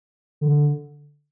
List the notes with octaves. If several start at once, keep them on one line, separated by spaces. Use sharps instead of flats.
D3